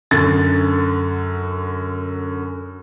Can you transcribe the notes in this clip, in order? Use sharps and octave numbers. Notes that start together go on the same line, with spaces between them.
F#2 D3 A6